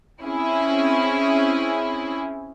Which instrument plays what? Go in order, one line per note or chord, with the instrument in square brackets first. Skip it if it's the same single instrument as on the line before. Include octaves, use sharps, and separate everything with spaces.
[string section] C4 C#4 E4 G#4